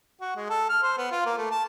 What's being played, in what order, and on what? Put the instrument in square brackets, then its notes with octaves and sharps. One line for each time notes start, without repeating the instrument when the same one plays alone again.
[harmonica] F#4
G#3
A4
F6
C5
B3
F4
A#3
A3
A5